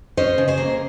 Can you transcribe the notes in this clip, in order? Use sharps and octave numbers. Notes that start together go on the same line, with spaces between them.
C#4 C5 D#5
C#3
G#4 C5
A#3